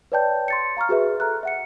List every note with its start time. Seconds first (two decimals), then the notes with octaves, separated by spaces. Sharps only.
0.12 B4 C#5 D5 G5 A5 G6
0.48 C6 A6 C#7
0.77 F5 A#5 C#6 F6
0.89 F#4 G#4 B4 E5
1.20 A4 A#5 F6 F#6
1.43 E5 F#5 C#7